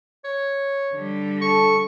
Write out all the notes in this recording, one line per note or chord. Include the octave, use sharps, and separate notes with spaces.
C#5
D3 G3
A4 C#6